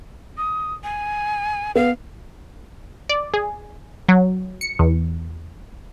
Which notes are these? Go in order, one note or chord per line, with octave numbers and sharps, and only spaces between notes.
D#6
G#5
B3 F5
D5
G#4
F#3
C#7
E2